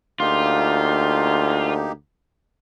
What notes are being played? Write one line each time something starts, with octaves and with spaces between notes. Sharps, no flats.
D2 A#3 D#4 F4 G4